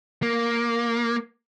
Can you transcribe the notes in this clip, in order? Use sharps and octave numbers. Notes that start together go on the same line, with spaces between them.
A#3